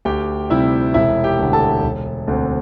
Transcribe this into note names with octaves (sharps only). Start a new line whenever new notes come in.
D2 G4 G5
C3 G3 C4 E4 E5
E1 E4 E5
G4 G5
D2 D3
A4 A5
E1
D2 D3 C4